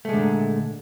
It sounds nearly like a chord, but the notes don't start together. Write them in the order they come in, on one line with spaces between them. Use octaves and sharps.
A3 G#3 D3 A#2